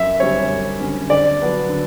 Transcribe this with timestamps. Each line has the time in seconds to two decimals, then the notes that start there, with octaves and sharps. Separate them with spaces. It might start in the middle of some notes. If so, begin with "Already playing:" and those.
Already playing: F#2 E5
0.20 D3 G3 C#4 C#5
0.50 F#2
0.80 D3 G3 C#4
1.10 D3 D5
1.40 F#3 B3 D4
1.69 D3